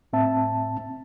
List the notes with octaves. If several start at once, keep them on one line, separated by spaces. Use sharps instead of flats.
A2 C4 E5 A5